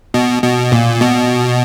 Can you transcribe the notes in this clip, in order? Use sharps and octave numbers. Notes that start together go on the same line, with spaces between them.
B2
B2
A#2
B2